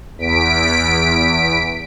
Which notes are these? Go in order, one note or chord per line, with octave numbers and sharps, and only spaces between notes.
E2 B6 D7